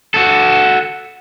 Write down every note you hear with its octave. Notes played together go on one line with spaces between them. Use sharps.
F#4 A4